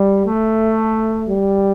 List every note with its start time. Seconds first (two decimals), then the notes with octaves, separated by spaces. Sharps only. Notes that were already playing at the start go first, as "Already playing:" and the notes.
Already playing: G3
0.25 A3
1.27 G3